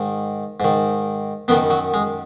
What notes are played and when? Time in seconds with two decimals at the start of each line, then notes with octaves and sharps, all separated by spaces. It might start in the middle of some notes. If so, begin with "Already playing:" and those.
Already playing: G#2 D#3
0.60 G#2 D#3
1.48 F#2 B2 D#3 B3
1.70 F#3
1.94 G#3